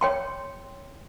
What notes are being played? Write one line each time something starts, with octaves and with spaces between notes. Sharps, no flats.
C#5 G5 C6